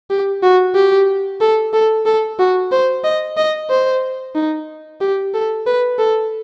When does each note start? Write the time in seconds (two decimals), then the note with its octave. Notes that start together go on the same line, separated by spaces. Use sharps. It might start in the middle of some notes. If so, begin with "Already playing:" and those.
0.10 G4
0.43 F#4
0.75 G4
1.41 A4
1.74 A4
2.06 A4
2.39 F#4
2.72 C5
3.04 D#5
3.37 D#5
3.70 C5
4.35 D#4
5.01 G4
5.34 A4
5.66 B4
5.99 A4